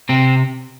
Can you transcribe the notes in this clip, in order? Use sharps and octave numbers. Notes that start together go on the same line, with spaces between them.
C3 C4